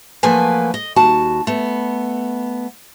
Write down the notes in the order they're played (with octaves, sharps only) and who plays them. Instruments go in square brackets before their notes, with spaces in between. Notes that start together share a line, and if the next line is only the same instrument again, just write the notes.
[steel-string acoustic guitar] F3 F#3 A3 A#3 B4 G#5
D#5
D#2 F#4 A5
A3 B3